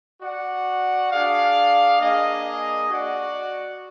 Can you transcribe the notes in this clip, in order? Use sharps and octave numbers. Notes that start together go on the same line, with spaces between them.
F#4 D5 F#5
D4 G#4 D5 F5
A#3 D4 G#4 D#5
F#4 D5 F#5